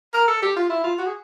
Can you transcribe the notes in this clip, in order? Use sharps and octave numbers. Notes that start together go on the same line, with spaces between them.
A#4
A4
G4
F4
E4
F4
F#4
G#4